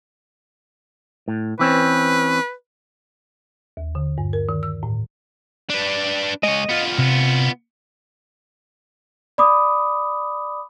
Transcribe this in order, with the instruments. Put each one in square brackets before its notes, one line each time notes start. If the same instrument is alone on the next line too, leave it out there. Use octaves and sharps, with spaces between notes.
[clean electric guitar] A2
[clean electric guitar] E3 C4 C#4 [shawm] B4
[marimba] D#2
D3
G2
A#4
D#3
E6
A2
[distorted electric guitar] D4 B4
[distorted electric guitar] G#3 C#5 [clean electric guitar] D#5
[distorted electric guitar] B3 F4
[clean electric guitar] C3
[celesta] D5 B5 D6 D#6